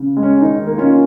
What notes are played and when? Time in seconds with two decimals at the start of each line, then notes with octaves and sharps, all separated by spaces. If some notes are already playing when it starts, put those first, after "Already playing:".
Already playing: C#3
0.17 G#3
0.23 C#4
0.41 D#3 D#4
0.66 A#3
0.78 C#4 F4